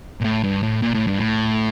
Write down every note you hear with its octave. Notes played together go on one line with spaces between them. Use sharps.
A#2
A2
G2
A2
A#2
A2
G2
A2